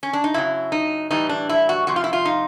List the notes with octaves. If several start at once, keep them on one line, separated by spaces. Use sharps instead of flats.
C#4
D4
D#4
F#2 C#3 F#3 E4
D#4
A2 E3 G3 D#4
D4
E4
F#4
F2 C3 F3 F#4
F4
E4
F4
D#4